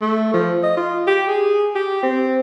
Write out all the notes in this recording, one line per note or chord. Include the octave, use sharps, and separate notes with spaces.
A3
F3
D#5
F4
G4
G#4
G4
C4